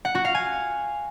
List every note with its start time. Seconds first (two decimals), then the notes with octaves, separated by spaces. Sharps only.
0.05 F#5
0.15 F#4
0.25 F5
0.35 G#5